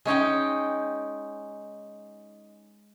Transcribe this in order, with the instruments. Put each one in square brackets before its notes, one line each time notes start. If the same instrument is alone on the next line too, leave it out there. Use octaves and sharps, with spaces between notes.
[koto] G#3 C#4 D#4 G5